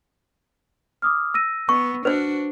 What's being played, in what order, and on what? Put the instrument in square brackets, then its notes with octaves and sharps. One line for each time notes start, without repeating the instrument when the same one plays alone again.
[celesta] D6 D#6 F6
E6 A#6 D#7
[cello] B3 [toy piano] C#6
[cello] D4 F#4 [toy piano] B4 C5